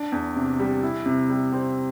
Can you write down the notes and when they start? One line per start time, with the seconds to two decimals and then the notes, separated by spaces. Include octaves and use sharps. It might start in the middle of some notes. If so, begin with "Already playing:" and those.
Already playing: D4
0.12 E2
0.36 C3
0.59 G3
0.83 E4
1.06 C3
1.29 G3
1.52 C4